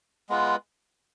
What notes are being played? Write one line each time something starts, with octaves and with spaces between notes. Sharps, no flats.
G#3 B3 F4 B4